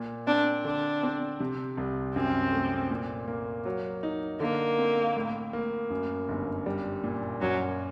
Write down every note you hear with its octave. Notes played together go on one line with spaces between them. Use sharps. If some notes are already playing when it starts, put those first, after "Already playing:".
Already playing: A#2
C4 D4
D3 D4
C4
C3
C2
F#2 C4
A3
A#2
A#3
F#3
D#4
D3 A#3
C4
A2
A#3
F#2
G1
G3
A#2
F#2 F#3